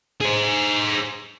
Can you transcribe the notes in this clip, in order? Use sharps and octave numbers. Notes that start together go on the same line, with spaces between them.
G#4 C5